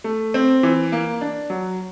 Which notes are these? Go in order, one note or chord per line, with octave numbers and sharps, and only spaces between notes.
A3
C4
E3
A#3
D4
F#3